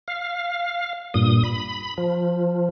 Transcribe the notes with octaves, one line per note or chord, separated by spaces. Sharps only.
F5
G2 A#2 D#6
B5
F3